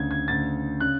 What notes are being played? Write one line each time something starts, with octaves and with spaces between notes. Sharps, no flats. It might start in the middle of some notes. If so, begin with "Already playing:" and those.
Already playing: D2 C#3 G#6
G#6
D2 C#3 A6
C#3 F#6